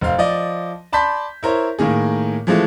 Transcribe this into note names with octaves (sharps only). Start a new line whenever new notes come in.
F1 C5 F5
F3 D5 D#5
D5 A5 B5 C6 G6 B6
E4 A#4 C5 C#5
A2 D#3 A#3 G#4
E3 F3 G#3 A3